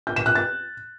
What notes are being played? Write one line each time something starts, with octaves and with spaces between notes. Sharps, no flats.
G6
E7
F#6
A6